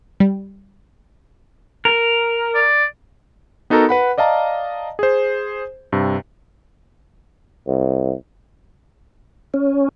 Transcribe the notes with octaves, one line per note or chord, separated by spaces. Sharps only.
G3
A#4
D5
B3 D#4 F#4 A4 A#4 A#5
B4 F#5 B5
D5 D#5 F5 A5 A#5
G#4 C5
G2 C3
C2
C#4